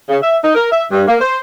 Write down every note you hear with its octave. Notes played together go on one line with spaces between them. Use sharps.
C#3
E5
D#4
A#4
E5
G2
A#3
C5